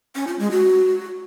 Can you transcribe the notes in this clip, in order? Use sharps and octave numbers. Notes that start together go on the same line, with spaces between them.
C#4
F4
G#3
F#4